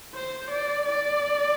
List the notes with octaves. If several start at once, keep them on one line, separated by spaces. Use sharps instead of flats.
C5
D5
D5